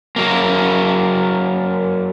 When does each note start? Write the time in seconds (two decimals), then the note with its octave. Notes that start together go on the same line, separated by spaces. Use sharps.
0.16 F#3 A#3